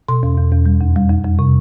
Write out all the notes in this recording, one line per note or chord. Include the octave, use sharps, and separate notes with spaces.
B2 C6
E2
E2
E2
G3
F2
G3
F2
F2
C3